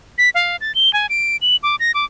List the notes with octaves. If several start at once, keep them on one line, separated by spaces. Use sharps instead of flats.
B6
F5
A6
G7
G#5
D7
F#7
D6
A#6
D6